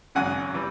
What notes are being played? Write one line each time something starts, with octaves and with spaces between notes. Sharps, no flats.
G#1 F#2 C#3 F#5 G#5
E3 G3